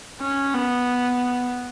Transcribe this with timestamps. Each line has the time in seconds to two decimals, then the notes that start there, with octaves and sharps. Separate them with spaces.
0.20 C#4
0.54 B3